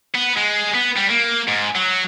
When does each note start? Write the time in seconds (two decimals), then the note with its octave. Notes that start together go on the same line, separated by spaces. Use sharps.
0.14 B3
0.36 G#3
0.74 B3
0.96 G3
1.10 A#3
1.48 G#2
1.75 F#3